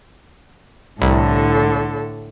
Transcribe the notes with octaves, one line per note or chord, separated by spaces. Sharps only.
C2 A2 D3 A4